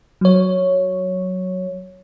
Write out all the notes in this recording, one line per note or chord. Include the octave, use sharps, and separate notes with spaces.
F#3 C#5